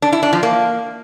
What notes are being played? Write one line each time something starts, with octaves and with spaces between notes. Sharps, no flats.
D4
E4
D4
F3
A#3